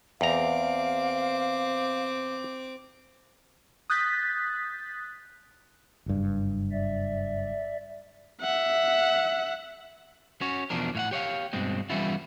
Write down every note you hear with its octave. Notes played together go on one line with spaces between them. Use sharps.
E2 C4 F5 A#5 D6
D#6 F#6 G6 A6 B6
F#1 G2
D5 E5
E5 F#5
C#4 F#4 C#5
E2 B2 F3 D4 A#4
A2 F5 F#5
G4 C#5 D5 F5
G2 B2 G#3 C4
E3 G3 B3 C#4 E4 F4